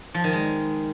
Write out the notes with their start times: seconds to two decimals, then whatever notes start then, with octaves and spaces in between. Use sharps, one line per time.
0.14 F3
0.24 D#3
0.33 G#3